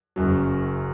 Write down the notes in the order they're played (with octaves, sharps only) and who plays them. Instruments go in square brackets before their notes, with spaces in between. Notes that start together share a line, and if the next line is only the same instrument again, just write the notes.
[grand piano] F#1 F#2 F#3